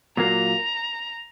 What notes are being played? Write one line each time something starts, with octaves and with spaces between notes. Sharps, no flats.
A#2 F#3 A#3 A#5